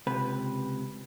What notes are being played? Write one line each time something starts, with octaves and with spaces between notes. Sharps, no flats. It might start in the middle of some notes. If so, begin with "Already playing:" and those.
C#2 C3 B4